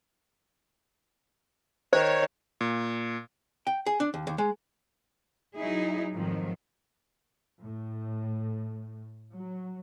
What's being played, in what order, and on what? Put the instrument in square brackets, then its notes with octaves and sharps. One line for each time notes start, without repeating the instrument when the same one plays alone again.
[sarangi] D#3 [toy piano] C5 [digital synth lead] C#5
[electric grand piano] A#2
[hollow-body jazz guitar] G5
G#4
D4
D#2
D#2
G#3
[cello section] F#3 D#4 E4 G#4
F2 G#2 D#3 F3 F#3
[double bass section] A2
F#3